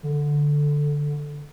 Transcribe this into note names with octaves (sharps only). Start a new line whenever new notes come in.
D3